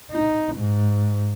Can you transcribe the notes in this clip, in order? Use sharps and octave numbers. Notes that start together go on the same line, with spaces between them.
D#4
G#2